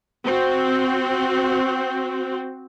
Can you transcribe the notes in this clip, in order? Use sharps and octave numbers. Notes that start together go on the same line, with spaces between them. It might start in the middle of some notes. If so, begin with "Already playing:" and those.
C4 F#4